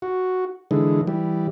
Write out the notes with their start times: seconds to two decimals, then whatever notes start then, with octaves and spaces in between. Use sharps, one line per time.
0.02 F#4
0.71 D3 E3 G#3
1.07 E3 G3